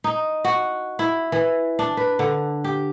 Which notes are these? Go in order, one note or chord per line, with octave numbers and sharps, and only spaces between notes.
D#4
F#4
E4
E3
D4
B4
D3
G4